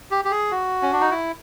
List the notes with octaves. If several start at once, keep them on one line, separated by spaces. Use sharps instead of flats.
G4
G4
G#4
F#4
C#4
D4
D#4
E4